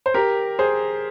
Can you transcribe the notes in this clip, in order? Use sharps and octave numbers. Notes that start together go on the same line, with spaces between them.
C5
G4 A#4
G#4 C5